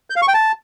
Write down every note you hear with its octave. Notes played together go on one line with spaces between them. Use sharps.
G6
F5
C#6
G5
A5